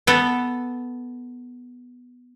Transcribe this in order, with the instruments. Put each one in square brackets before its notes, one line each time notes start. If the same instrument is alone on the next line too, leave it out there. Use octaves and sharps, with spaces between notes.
[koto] B3 A4